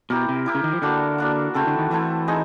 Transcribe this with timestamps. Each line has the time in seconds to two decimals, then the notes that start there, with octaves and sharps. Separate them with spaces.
0.10 B2 E4 G4 A#4
0.29 C3
0.46 E4 G4 A#4
0.55 C#3
0.64 D#3
0.73 F3
0.82 D3 A#3 D4 F#4
1.18 A#3 D4 F#4
1.54 C#3 A3 C4 E4 A4
1.67 D3
1.79 D#3
1.90 E3 A3 C4 E4 A4
2.27 G#3 C4 D#4 G#4